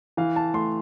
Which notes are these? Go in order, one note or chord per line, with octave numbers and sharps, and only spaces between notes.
E3 F5
A5
A3 C6